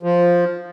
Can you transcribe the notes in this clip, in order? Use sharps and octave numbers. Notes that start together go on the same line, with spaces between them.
F3